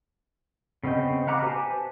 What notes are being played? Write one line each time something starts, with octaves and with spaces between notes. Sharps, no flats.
C#3 B3 C4 D#5 G6
F5 F#5 A#5 B5 D6
G4 B4 C5 G#5 A5